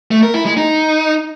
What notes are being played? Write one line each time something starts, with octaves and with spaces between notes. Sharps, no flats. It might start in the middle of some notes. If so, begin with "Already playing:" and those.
A3
A#4
E4
G#3
D#4